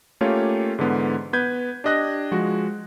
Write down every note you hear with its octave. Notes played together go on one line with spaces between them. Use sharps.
A3 A#3 C#4 F4 G4 C#5
G#2 D3 E3 B3
B3 B4 G6 G#6
D4 G4 D#5 F#6 A#6
F3 G#3 F#4